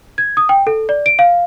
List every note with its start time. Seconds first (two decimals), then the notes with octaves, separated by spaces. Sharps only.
0.18 G#6
0.37 D#6
0.49 G5
0.67 A4
0.89 D5
1.06 D7
1.19 F5